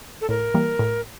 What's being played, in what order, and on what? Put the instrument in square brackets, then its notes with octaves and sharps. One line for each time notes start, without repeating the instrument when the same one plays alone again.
[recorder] A4
[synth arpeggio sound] A2 [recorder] A#4
[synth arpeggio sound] E3 G3 A#3
A2